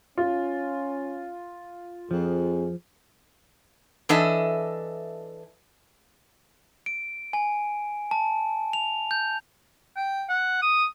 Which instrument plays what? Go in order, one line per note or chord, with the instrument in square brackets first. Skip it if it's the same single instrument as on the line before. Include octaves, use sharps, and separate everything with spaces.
[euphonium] C#4 [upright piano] F4
[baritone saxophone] F2 [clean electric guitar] F3 [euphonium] G#4
[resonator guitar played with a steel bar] E3 D4 A4 D#5 E5
[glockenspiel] D7
G#5
A5
F7
G6
[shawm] G5
F#5
D#6